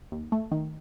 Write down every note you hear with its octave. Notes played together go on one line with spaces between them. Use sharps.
D#2
A3
D#3